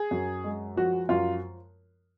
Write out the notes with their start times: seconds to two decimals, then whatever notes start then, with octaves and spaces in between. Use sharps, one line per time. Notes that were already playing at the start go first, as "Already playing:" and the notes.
Already playing: G#4
0.11 F#2
0.44 G#3
0.76 F3 F#4
1.09 F#2 F4